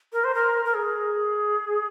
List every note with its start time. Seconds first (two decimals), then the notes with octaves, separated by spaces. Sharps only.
0.13 A#4
0.24 C5
0.35 A#4
0.65 A#4
0.74 G#4